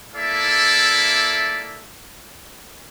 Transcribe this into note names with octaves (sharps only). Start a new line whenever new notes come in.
A#3 E4 A4 D5 E5